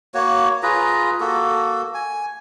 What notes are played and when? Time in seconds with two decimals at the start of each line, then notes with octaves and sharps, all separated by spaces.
0.14 A#3 F#4 C#5
0.63 F4 G#4 B4 A#5
1.20 A#3 F#4 A4
1.94 G#5